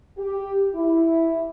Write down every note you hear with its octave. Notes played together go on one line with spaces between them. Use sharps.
G4
E4